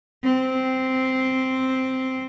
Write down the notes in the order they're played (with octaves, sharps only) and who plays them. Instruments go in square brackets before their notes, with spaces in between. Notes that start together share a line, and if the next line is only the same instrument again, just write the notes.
[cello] C4